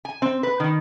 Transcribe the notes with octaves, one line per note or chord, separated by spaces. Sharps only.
G#5
C4
B4
D#3